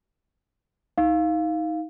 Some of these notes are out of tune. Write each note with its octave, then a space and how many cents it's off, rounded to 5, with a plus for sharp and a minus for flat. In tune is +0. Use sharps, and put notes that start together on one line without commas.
D#4 +25 F5 +0